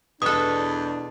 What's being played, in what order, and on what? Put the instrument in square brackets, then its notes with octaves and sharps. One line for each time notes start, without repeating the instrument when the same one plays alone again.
[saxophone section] E2 [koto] B2 A4 [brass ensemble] D4 [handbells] D#6 F#6